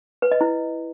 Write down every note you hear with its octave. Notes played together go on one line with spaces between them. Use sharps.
B4
D#5
E4